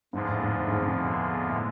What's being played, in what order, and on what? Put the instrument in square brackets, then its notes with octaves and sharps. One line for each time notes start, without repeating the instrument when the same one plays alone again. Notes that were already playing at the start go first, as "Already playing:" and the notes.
[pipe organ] E2 D3 F3 G#3 [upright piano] G#2
[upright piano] A2
G#2
A2
G#2
F2
G#2
B2
A2